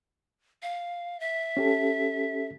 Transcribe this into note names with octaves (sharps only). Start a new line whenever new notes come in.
F5
E5
C#4 G4 A4